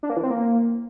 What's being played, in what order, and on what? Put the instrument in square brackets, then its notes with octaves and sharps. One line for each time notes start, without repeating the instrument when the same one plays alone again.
[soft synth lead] D4
A#3
E3
C4
A#3